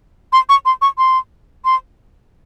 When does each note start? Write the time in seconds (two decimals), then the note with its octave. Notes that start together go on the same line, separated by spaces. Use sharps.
0.33 C6
0.49 C#6
0.65 C6
0.82 C#6
0.98 C6
1.65 C6